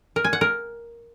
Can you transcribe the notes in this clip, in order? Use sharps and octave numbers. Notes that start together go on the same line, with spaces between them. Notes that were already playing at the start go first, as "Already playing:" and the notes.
A#4
G#5
F#5
A#4